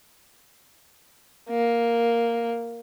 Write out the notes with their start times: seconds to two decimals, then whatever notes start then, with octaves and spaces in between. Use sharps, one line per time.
1.50 A#3